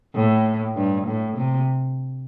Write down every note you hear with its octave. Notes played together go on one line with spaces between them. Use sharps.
A2
G2
A2
C3